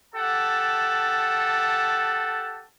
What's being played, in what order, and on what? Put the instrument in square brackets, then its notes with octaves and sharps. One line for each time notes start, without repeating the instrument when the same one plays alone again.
[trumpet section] G4 A4 F#5 A5